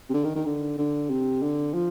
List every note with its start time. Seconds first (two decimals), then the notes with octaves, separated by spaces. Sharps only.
0.09 C3
0.14 D3
0.24 D#3
0.35 D#3
0.46 D3
0.78 D3
1.10 C3
1.42 D3
1.74 F3